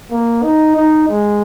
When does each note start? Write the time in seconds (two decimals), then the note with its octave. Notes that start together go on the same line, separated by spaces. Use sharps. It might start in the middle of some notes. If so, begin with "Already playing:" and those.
0.11 A#3
0.43 D#4
0.76 D#4
1.09 G#3